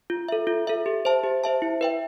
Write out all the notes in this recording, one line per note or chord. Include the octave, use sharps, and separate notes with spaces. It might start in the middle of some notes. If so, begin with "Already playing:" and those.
F4
A4 E5
F4
A4 E5
G4
C5 E5 A5
G4
C5 E5 A5
E4
B4 E5 G5